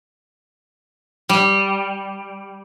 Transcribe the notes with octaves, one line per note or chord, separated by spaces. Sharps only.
G3